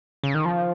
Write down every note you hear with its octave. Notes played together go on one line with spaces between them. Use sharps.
C#3
D#3
F3